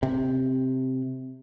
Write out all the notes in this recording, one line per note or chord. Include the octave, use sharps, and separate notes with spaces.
C3